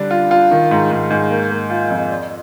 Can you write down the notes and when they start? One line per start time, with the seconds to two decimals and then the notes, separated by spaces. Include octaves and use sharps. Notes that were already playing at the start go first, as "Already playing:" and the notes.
Already playing: D3 G3 D4
0.11 F4
0.31 F4
0.51 D#3
0.71 G#2
0.91 G#2
1.10 G#2
1.30 A#3
1.51 A#3
1.70 F4
1.90 F2
2.10 D5